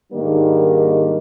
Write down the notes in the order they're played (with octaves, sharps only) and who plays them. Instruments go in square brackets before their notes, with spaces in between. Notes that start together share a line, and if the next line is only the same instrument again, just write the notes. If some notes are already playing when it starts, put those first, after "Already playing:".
[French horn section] G#2 D#3 G3 A#3 D4